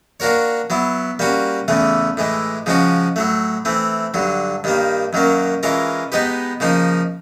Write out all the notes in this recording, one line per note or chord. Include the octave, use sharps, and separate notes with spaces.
A#3 D4 F#4 A#4 C#5
F#3 B3 E4
G3 A#3 C#4 F#4
E2 C#3 E3 A3
A2 E3 G#3
C#3 F3 G#3 C#4 F#4
A2 F#3 A3
E3 A3 C4
G2 D3 F#3
G2 D#3 G3 A#3
F#2 D#3 F#3 A#3 C#4
E3 G#3 C#4 F4 A#4
G#3 B3 D#4 G4 B4
C#3 F3 A#3 D#4